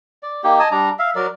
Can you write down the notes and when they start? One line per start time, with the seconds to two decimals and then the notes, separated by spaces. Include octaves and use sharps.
0.23 D5
0.44 A#3 D#4 G4
0.60 D#5 G#5 A5 D#6
0.71 G3 D4 A#5
0.99 E5 F5
1.15 F#3 A#4 D5